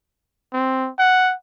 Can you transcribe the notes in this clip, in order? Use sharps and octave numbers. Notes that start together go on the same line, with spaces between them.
C4
F#5